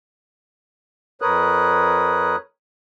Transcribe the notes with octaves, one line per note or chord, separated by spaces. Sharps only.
F2 A#4 B4 C#5 D#6 F#6